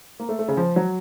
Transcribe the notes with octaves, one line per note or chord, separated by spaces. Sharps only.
A#3
A3
A3
C#3
F3
F#3